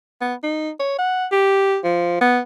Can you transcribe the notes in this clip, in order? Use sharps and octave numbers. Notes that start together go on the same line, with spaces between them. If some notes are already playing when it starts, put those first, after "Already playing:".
B3
D#4
C#5
F#5
G4
F3
B3